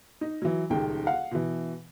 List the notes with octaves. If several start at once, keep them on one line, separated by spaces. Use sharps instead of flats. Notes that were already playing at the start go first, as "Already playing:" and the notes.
D#4
E3 F#3
D#1 C#2 D#3 G5
F5 F#5
B2 E3